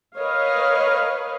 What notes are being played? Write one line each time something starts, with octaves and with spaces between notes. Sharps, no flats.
A#4 B4 C#5 D#5 F5